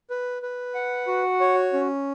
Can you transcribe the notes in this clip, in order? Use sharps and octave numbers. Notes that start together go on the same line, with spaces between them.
B4
B4
F#5
F#4
C#5
C#4